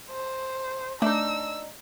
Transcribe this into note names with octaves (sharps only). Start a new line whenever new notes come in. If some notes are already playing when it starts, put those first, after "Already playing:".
C5
A3 D4 D#4 E6